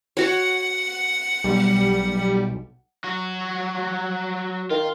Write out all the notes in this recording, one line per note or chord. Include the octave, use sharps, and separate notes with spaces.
F#4 C#5 F#5
B1 G3
F#3 F#4
D#3 F4